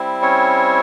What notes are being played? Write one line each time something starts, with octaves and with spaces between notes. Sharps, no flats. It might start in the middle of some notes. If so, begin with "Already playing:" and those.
Already playing: G3 C4 E4
C#4 C#5